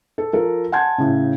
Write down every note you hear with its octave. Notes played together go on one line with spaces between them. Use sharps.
A4
F3 A4 A#4
F#5 G#5 A5 C6 G6 G#6
A2 C#3